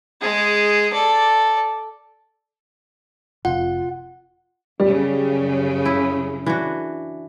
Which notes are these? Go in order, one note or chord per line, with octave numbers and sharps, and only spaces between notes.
G#3 G#4
A4 D5
F1 C3 F4 F#5
F#2 C#3 G3
E4
E3 D4 F#4